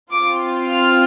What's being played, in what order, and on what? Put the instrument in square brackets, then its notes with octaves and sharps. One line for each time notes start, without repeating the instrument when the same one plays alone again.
[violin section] C4 F4 D6
F6